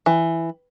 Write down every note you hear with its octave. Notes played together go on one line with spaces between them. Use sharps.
E3